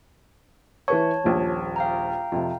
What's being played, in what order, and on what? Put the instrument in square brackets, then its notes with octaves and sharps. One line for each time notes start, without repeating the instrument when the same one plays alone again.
[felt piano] E3 B4 C#6 [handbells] C#5 A5
[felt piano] D#1 A#1
[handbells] F5 G5 A#5
[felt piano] F2 C3